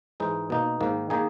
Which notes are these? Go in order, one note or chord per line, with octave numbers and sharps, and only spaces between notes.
G#2 E3 G#3 D#4
B2 A#3 D#4
G#2 D#3 A#3
D#3 A#3 D#4 G#4